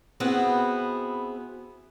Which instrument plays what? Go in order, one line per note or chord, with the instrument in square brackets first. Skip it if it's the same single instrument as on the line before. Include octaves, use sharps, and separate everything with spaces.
[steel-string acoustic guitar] B3 C4 E4 F#4 G#4